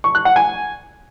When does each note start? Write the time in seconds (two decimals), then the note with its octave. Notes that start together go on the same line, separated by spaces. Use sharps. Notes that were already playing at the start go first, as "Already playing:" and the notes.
0.04 C#6
0.15 F#6
0.25 F#5
0.36 G#5